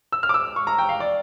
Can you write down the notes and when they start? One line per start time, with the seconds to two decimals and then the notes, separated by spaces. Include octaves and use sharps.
0.12 E6
0.23 F6
0.29 D6
0.34 E6
0.56 C#6
0.67 A#5
0.79 G5
0.89 F5
1.00 D5